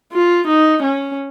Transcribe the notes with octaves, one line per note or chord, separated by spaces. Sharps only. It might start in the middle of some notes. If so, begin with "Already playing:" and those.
F4
D#4
C#4